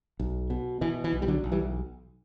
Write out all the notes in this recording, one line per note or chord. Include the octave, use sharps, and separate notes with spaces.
B1
B2
B2 E3
E3
B1
G3
D3 F#3
B1
E3 G3